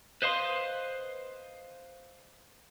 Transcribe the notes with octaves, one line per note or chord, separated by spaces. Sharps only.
B4 C5 D#5 F5 C6